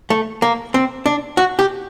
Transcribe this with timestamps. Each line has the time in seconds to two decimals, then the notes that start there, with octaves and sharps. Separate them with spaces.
0.10 A3
0.42 A#3
0.74 C4
1.06 D4
1.37 F#4
1.59 G4